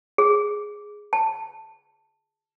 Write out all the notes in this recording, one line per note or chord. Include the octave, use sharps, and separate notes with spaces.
G#4
A5